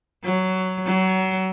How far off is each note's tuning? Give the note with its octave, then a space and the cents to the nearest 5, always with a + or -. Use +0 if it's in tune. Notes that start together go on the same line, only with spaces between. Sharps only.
F#3 +10
F#3 +30